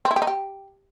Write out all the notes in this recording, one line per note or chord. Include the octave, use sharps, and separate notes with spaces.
C4
E4
G4
D#4
G4